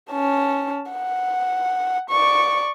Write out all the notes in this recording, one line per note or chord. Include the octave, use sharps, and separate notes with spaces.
C#4 A5
F#5
D5 C#6